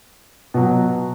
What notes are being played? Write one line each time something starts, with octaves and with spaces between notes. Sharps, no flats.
B2 F#3